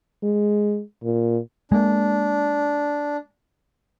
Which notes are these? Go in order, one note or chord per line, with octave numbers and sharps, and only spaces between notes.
G#3
A#2
G#3 A#3 D4